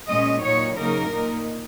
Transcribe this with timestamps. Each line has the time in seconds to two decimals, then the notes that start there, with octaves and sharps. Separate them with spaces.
0.08 A#2 G#3 C#4 D#5
0.42 A#2 F#3 D#4 C#5
0.76 C#3 F#3 A#3 D#4 A#4
1.09 A#2 A#3 D#4